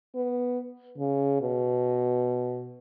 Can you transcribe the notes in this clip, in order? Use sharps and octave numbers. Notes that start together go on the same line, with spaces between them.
B3
C#3
B2